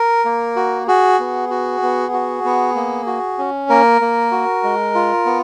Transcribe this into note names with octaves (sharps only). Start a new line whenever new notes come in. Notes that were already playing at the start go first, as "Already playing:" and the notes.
Already playing: A#4
A#3
F#4
F#4 G#4
B3
F#4
B3
F#4
B3
A#3
F#4
C#4
A#3 A#4
A#3
F#4
G#3
F4
B3